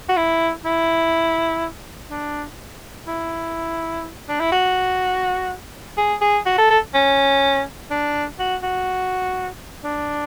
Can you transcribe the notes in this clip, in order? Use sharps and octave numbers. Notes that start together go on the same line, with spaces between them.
F#4
E4
E4
D4
E4
D4
E4
F#4
G#4
G#4
F#4
A4
A4
C#4
D4
F#4
F#4
D4